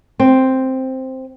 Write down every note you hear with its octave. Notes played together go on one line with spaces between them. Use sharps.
C4